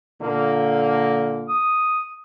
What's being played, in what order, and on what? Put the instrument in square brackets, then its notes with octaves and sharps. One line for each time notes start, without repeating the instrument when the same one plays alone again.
[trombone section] A#2 D3 A#3
[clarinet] D#6